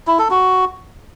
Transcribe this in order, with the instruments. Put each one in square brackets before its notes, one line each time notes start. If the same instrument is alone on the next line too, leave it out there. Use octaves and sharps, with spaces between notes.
[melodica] E4
A4
F#4